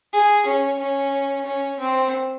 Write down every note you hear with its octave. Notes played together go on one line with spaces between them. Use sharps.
G#4
C#4
C#4
C#4
C4